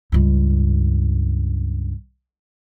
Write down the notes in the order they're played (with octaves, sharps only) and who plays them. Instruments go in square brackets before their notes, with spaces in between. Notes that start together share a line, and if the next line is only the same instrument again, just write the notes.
[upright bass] C#2 G2